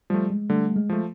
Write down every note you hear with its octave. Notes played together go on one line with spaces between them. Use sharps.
F3 G3 A3
G#3
D3 G3 A3
G#3
F3 A3